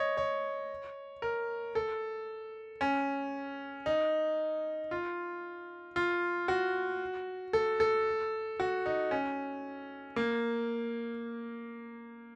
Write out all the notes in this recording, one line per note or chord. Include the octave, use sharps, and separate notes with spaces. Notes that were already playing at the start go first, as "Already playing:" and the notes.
Already playing: C#5 D#5
C#5
A#4
A4
C#4
D#4
F4
F4
F#4
A4
A4
F#4
D#4
C#4
A#3